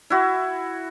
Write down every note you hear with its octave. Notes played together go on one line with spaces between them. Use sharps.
E4 F#4